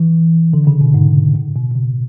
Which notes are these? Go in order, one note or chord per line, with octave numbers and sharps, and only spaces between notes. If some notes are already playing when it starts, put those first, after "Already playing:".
Already playing: E3
D3
C#3
B2
G#2
A2
B2
B2
C#3